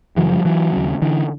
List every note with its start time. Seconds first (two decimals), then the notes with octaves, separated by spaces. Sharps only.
0.16 F#2 C#3 E3 F#3
0.30 F3 G3
0.45 E3 F#3
0.73 D#2 C#3
1.02 D3 E3